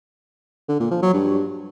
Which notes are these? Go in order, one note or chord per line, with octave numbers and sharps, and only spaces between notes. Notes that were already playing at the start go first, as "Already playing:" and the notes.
D3
A#2
F3
F#3
G2